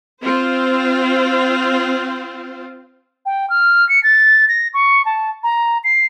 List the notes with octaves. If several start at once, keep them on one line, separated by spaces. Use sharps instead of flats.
C4 F4 C5
G5
F6
C#7
A6
A#6
C#6
A5
A#5
C7